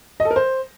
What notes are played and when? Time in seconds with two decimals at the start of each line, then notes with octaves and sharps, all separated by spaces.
0.20 D#5
0.25 A4
0.31 A#4
0.36 C5